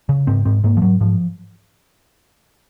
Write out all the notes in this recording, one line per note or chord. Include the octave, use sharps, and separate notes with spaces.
C#3
G#2 C4
G#2 C4
G#2 A#3
F3
G#2 F#3
G#2 F3